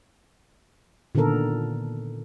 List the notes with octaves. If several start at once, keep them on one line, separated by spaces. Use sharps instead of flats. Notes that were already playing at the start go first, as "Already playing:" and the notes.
A#2 D3 D#3 B3 A4 A#4